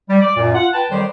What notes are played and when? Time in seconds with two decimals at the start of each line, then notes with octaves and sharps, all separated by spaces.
0.09 G3
0.22 D5
0.37 F#2 A#2
0.54 F4 F#5
0.74 B4 G5 A5
0.91 F2 D#3 F#3 G3 C5